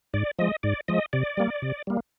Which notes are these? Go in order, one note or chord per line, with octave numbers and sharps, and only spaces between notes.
G#2 D5
F3 G#3 D#5
G#2 D5
F3 G#3 D#5
C3 D5
G3 A#3
C3
G3 A#3